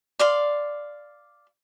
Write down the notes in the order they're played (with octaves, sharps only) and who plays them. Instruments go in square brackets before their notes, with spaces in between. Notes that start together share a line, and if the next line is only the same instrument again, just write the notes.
[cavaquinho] D5 F5 C6